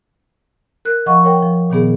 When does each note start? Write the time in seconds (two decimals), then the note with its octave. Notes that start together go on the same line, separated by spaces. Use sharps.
0.85 A#4 F#6
1.06 F3 D#5 F#5 C#6
1.24 A#4 C#5 G5
1.43 F3
1.70 A#2 D#3 B3 G#4